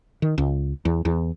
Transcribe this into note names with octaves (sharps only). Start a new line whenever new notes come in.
D#3
C#2
E2
E2